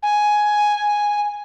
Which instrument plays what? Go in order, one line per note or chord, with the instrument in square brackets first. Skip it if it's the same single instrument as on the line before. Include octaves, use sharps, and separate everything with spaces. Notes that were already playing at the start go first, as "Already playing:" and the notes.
[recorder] G#5